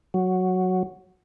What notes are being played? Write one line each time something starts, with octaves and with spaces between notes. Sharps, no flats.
F#3